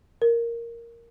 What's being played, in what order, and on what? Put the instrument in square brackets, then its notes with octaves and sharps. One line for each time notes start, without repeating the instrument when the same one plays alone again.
[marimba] A#4